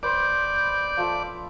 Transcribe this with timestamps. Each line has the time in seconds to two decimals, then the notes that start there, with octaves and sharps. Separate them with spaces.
0.03 B4 C5 D5 G6
0.97 F3 A4 E5